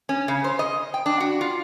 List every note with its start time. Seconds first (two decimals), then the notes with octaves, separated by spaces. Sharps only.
0.09 C#4
0.28 C#3
0.44 C5
0.59 D#5
0.94 G5
1.06 D4
1.20 F#4
1.41 F4